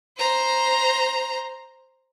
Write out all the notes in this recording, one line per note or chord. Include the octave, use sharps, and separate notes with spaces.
C5 A#5